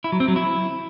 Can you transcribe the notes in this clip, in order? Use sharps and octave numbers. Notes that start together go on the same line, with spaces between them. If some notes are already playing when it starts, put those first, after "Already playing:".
E4
F#3
C4
F#3
E4